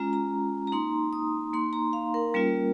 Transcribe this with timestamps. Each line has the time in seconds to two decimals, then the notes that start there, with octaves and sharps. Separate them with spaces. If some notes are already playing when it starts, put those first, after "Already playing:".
Already playing: G#3 C#4 F4 A#5
0.13 A#5
0.67 A#5
0.72 A#3 D#4 C6
1.13 D#6
1.53 A#3 D#4 C6
1.73 A#5
1.93 F5
2.14 A#4
2.34 G3 A#3 C#4 F4